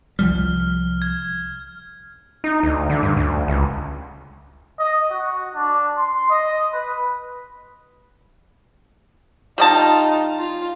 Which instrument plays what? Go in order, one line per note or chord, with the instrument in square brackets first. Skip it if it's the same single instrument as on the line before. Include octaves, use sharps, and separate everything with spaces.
[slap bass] C2 F3 G3 [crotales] F6
[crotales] G#6
[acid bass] D#4
D2
D3
G2
D2
C#2
[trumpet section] D#5
F#4
D4
C6
D#5
B4
[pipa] G3 D#5 A5 [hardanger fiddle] D#4 F4
[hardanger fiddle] F4